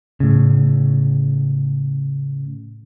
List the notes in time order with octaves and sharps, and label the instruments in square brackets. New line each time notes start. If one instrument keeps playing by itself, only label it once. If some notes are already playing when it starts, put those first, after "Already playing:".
[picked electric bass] A2 C#3